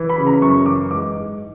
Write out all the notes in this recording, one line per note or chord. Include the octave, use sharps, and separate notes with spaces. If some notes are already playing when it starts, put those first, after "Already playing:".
Already playing: E3
B5
C#3
A#5
F#2 C#6
E3 D6
G#2 D6
G#2